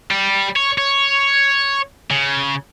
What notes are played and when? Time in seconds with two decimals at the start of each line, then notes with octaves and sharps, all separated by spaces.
0.11 G3
0.56 C#5
0.78 C#5
2.11 C#3